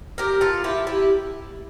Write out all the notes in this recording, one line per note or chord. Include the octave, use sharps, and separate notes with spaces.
G4 A#4
F4 A4
E4 G4
E4 G4